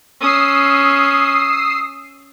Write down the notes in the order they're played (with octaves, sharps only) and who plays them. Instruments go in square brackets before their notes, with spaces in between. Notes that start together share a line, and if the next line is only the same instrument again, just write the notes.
[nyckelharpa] C#4 [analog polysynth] D#6 E6 C7